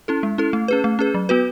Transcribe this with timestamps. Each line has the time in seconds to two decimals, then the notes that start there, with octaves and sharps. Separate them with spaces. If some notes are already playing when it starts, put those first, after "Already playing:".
0.08 C#4 E4 A4
0.23 G#3
0.38 C#4 E4 A4
0.53 A3
0.68 C#4 G#4 B4
0.84 A3
0.99 C#4 G#4 B4
1.14 F#3
1.29 B3 F#4 B4